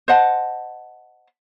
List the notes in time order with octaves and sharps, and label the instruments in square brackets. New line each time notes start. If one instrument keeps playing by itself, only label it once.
[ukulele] C5 D#5 F#5 A5